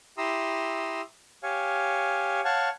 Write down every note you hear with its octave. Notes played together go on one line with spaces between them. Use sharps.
E4 G4 A#5 C6 D#6 E6
G4 C#5 F5 G#5
C#5 F5 F#5 A5 C#6